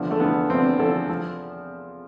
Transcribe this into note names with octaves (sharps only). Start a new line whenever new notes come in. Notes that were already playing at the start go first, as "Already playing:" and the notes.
Already playing: E2 D3 F3
A3
E2 D3 F3 B3
E2 D3 F3 C4
E2 D3 F3 A4
F3